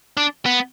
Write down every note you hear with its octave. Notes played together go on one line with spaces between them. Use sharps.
D4
B3